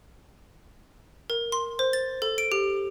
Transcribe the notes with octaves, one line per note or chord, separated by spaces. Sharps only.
A#4
C6
C5
A6
A4
D7
G4